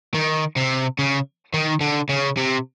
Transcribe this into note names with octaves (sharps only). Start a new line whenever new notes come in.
D#3
C3
C#3
D#3
D3
C#3
C3